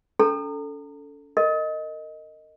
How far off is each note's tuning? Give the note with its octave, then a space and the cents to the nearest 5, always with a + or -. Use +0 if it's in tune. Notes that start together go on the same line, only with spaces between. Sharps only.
C#4 +45 A4 +0 A#5 -35
A#4 -30 D#5 +0